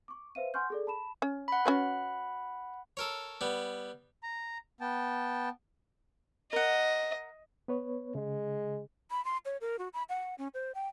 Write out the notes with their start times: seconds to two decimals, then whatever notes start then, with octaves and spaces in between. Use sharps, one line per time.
0.08 C#6 D6
0.35 B4 C5 E5 F5 D#7
0.54 F#5 G#5 C6 C#6 F6 G6
0.70 G#4 A4 D5
0.87 A5 B5 E7
1.22 C#4
1.48 F#5 B5
1.65 C#4 F#4 B4
2.97 A4 A#4 C#5
3.41 G3 B3
4.23 A#5
4.81 B3 G5 A5
6.53 A#4 D#5 F#5
7.68 B3 B4 C#5
8.15 C#3 G#3
9.11 B5
9.25 C6
9.45 C#5
9.61 A#4
9.79 F#4
9.94 B5
10.09 F#5
10.38 C#4
10.54 C5
10.75 G5